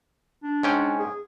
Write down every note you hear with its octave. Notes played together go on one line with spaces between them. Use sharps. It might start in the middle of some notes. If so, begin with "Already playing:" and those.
D4
G#2 C#4 G5
G#4